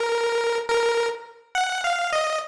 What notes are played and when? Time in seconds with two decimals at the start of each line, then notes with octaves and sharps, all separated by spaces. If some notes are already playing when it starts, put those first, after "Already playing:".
Already playing: A#4
0.69 A#4
1.55 F#5
1.84 F5
2.13 D#5